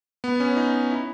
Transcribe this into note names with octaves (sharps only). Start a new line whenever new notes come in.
B3
C#4
D#4
E4